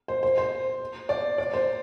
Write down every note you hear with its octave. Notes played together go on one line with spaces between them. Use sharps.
C5
C5
C5
D5
D5
C5